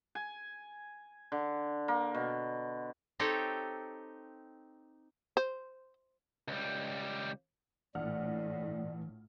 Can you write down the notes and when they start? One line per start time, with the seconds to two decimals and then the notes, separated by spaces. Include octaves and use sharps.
0.15 G#5
1.32 D3
1.88 A#3
2.15 B2
3.19 C4 D#4 G4 A4 C#5
5.37 C5
6.48 C#2 G3
7.95 A#1 A2 E3 D5 F#5 F6